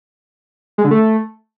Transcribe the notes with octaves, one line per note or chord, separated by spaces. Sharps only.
G#3
D3
A3